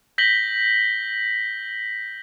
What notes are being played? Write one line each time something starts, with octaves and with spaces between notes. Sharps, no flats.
G6 A#6 B6 F#7 G7